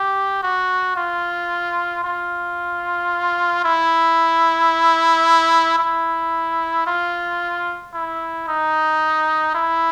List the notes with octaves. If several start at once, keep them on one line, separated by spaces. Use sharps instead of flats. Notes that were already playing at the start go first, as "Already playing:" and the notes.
Already playing: G4
F#4
F4
F4
E4
E4
F4
E4
D#4
E4